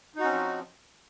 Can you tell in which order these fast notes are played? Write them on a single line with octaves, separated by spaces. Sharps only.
D#4 F#4 C#4 C4 F3